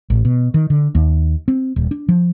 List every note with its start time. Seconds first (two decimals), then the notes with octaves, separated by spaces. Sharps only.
0.10 A1
0.25 B2
0.54 D#3
0.70 D3
0.95 D#2
1.48 C4
1.76 D#1
1.91 D4
2.08 F3